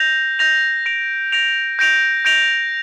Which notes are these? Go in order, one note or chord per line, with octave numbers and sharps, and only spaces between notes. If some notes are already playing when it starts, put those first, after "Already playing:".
Already playing: G6 A#6 F7
G6 A#6 F7
A#6 D7 F7
A#6 D7 F7
G6 A#6 D7 F7
G6 A#6 D7 F7